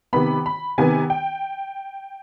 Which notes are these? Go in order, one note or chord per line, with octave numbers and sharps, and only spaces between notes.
C3 D#3 B3 B5
B5
C3 D#3 B3 G#5
G5